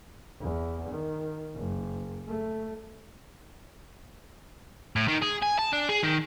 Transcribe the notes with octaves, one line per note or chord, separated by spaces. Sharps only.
E2
D#3
F#1
A3
A2
D#3
G#4
G#5
A5
D4
G#4
D#3